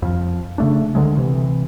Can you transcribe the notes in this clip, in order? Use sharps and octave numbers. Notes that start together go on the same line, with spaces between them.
F2 F3
C#3 A3 D4
D2 D3 F#3 G#3
C3 E3